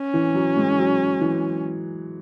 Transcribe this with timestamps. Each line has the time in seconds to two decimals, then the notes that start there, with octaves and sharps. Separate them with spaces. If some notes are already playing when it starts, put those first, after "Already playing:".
Already playing: C#4
0.14 E3
0.34 F#3
0.57 G#3
0.78 F#3
1.21 E3